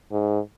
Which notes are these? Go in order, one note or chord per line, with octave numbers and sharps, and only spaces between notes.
G#2